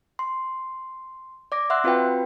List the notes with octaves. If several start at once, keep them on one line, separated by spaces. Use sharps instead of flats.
C6
D5 D6 A#6
E5 F#5 C6 E6 F#6
C4 F4 F#4 B4 F5 G5